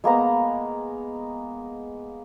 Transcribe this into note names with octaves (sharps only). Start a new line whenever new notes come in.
G#3 A#3 B3 A#5